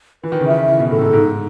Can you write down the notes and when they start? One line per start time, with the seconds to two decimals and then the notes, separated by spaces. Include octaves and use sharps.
0.23 E3 B4
0.32 D#3
0.41 C#3
0.46 D#3 E5
0.68 C#3 E4
0.79 B2
0.91 A2 A4
1.01 G#2
1.13 G#2 D#4